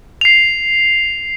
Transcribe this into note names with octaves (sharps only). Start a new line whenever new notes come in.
C7 F7